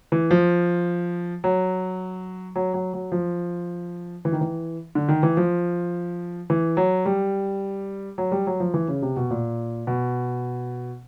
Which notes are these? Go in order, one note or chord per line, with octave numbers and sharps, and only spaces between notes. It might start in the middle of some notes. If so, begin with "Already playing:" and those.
E3
F3
F#3
F#3
F#3
F#3
F3
E3
D#3
E3
D3
D#3
E3
F3
E3
F#3
G3
F#3
G3
F#3
F3
E3
C#3
C3
B2
A#2
B2